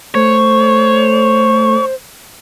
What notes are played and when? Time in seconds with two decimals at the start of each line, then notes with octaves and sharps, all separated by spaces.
0.15 A3 C5 C#5